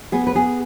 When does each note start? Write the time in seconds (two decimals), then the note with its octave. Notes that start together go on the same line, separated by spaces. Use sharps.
0.12 B3 G#4
0.27 B4
0.35 B3 G#4